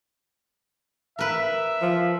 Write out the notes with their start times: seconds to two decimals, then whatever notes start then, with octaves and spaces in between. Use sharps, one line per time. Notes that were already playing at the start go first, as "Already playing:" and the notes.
1.19 A#4 B4 E5
1.82 F3